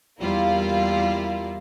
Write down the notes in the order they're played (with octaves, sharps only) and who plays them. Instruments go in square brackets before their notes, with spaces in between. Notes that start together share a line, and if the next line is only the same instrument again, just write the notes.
[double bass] E2 G3 [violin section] A#3 E4 F4